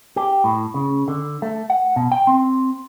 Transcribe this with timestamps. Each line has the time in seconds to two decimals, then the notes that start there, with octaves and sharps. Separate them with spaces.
0.16 G4
0.44 A2
0.74 C#3
1.08 D3
1.42 A3
1.70 F#5
1.96 B2
2.12 G5
2.27 C4